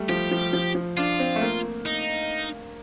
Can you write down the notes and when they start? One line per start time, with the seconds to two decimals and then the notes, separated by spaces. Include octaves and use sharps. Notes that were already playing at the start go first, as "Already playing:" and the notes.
Already playing: G3 A3
0.09 F3 G4
0.31 F3
0.53 F3
0.75 F3
0.97 D4 F4
1.19 C4
1.36 A3
1.41 A#3
1.86 D#4